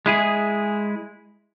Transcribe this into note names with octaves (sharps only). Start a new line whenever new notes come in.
G#3 E4 G#4